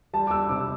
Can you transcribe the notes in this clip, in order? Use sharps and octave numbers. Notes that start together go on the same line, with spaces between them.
G3 A5
D6
E6
C3 D6
E6